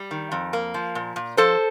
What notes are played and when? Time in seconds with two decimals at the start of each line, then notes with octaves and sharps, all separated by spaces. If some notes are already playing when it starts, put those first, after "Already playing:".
Already playing: G3
0.11 D#3
0.32 F2
0.53 A#3
0.74 F3
0.95 A#2
1.16 A#2
1.37 F3 A4 C5